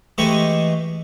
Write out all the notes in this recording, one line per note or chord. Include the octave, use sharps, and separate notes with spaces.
E3 G#3 A3 G4 D#5 C#6